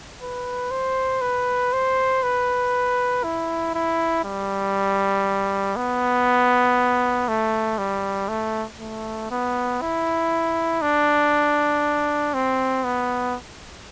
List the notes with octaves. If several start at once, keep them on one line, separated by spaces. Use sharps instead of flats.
B4
C5
B4
C5
B4
E4
E4
G3
B3
A3
G3
A3
A3
B3
E4
D4
C4
B3